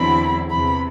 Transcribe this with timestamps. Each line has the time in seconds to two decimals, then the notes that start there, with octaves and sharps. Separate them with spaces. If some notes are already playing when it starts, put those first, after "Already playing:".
Already playing: E2 D3 F#3 C4 E4 B5
0.50 E2 C3 E3 B5